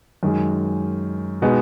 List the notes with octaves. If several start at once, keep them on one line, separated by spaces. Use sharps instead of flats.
F#2 D#3 G#3
B2 G#3 B3 D#4